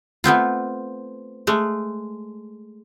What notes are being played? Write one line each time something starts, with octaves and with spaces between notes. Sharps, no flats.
A3 B3 C4 F4
G#3 A3